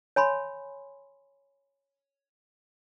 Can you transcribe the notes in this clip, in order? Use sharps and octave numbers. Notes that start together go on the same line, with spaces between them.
C#5 G#5 B5 C6